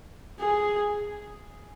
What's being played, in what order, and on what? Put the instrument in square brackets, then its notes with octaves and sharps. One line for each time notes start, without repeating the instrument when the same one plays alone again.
[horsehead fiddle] G#4